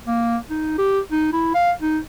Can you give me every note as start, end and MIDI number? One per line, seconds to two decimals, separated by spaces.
0.07 0.37 58
0.50 0.73 63
0.78 1.00 67
1.12 1.28 63
1.33 1.51 64
1.54 1.72 77
1.82 1.99 63